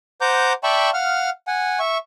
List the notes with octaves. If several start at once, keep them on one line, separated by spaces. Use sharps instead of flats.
C5 F#5 A#5 D6 G6
D5 E5 G5 A5 B5 C#6
F5 F#5 F6
F#5 G#5
E5 C#6